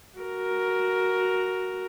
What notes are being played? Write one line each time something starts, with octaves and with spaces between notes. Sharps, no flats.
F#4 A#4